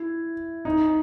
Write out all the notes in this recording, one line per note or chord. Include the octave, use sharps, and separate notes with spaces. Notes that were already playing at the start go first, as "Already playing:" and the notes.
Already playing: E4
D#4